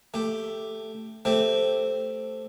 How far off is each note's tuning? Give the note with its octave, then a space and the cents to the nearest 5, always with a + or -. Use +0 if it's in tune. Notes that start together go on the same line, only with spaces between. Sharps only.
A3 +0 G4 +0
A3 +0 C4 +0 G4 +0